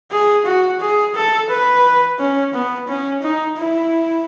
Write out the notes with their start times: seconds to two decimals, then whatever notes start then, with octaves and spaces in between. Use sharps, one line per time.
0.11 G#4
0.46 F#4
0.81 G#4
1.15 A4
1.50 B4
2.19 C#4
2.54 B3
2.88 C#4
3.23 D#4
3.57 E4